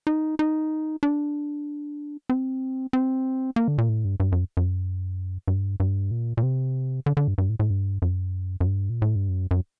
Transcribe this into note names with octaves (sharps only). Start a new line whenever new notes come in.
D#4
D#4
D4
C4
C4
A#3
D3
A#2
A2
G2
G2
F#2
F#2
G2
G2
A#2
A#2
C3
D3
D3
G2
G2
A2
A2
G2
F#2
F#2
G2
A#2
A2
G2
F#2
F#2